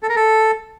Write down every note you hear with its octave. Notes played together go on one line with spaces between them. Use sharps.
A4
A#4
A4